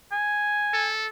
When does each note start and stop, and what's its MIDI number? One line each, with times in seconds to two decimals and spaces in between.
0.12 0.90 80
0.74 1.07 69